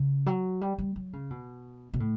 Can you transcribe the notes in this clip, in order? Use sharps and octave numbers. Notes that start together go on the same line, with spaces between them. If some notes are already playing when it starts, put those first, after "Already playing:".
Already playing: C#3
F#3
G3
G3
F#3
C#3
B2
B2
A2